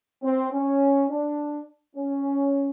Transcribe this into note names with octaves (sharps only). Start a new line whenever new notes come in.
C4
C#4
D4
C#4